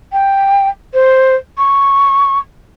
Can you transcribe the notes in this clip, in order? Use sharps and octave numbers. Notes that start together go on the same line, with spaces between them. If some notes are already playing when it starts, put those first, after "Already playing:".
G5
C5
C#6